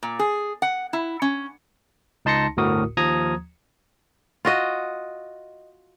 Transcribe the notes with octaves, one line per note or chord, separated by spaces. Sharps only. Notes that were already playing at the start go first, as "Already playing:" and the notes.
A#2
G#4
F#5
E4
C#4
C#2 D#4 A5 C6 A#6 C#7
G1 D2 A2 F#4 A#4 D#6
D#2 F3 A#5 D#6 G#6
F4 F#4 D#5